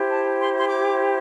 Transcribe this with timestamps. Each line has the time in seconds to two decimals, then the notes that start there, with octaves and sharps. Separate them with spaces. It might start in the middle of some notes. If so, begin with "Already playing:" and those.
Already playing: E4 G4 C5
0.12 A5
0.41 C6
0.58 C6
0.68 D6